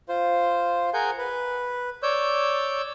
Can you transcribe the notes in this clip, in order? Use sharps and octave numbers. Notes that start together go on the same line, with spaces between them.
F4 C5
G#4 A#4 F#5 G#5 G6
B4
C#5 D5 E6 G6